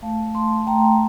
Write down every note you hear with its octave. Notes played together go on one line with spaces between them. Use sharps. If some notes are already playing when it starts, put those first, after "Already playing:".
A3 F5 A5
A3 A5 C6
A3 G5 A#5